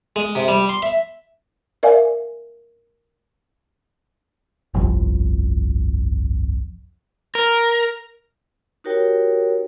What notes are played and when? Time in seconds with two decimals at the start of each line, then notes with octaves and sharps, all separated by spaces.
0.16 G#3
0.35 C3
0.48 G3
0.69 C6
0.82 E5
1.83 A#4 D5 E5 F5 G#5
4.74 G1 C2 F2
7.35 A#4
8.84 D#4 F#4 G4 A#4 C#5 G5